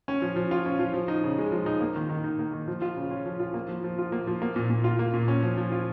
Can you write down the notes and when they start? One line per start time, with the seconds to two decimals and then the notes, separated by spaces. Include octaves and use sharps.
0.08 C#4
0.22 F3
0.36 F3
0.51 F4
0.66 C#4
0.79 F3
0.94 F3
1.08 D#4
1.24 C#3
1.38 G#3
1.52 F3
1.66 D#4
1.81 A#3
1.96 D#3
2.09 D#3
2.24 D#4
2.39 A#3
2.53 D#3
2.68 F3
2.82 F4
2.96 C#3
3.11 C#4
3.26 F3
3.40 F4
3.54 A#3
3.68 F3
3.84 F3
3.98 F4
4.12 A#3
4.27 F3
4.42 A#3
4.56 A#2
4.70 A#2
4.84 F4
4.99 A#3
5.14 A#2
5.28 C#4
5.43 F3
5.57 F3
5.72 F4